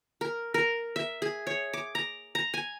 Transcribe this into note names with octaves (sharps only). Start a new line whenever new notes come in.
A#4
A#4
E5
G#4
C#5
D6
A#5
A#5
G#5